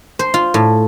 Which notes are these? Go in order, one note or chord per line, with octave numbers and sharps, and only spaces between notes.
C5
F4
A2